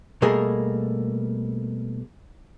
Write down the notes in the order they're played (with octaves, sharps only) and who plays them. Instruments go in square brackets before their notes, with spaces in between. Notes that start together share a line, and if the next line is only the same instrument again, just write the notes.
[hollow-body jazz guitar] B2 G3 A3 A#3 G#4 A#4